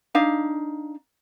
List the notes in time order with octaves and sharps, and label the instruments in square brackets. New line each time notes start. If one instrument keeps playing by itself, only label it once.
[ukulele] D4 D#4 F5